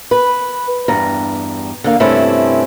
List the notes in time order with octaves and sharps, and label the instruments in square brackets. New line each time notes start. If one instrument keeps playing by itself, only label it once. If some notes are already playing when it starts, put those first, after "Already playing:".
[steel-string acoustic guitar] B4
E2 G2 A#5
D3 A#3 F5
G2 C3 A3 C4 C#4 E4